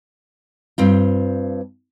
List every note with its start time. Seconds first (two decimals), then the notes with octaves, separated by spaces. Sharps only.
0.78 G2 C4 F4